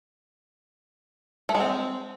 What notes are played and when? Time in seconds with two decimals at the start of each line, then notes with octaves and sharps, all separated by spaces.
1.49 A3
1.55 G#3
1.60 C4